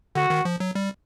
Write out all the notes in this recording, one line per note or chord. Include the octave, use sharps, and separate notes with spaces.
D3 F#4
D#3
F3
F#3
G3